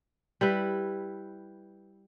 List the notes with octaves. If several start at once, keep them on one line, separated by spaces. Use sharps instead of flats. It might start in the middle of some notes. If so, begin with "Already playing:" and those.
G3 E4 B4